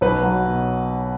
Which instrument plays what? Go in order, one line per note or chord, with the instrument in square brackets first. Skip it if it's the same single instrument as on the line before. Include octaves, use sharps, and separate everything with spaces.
[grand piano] B1 B4
F#3
B2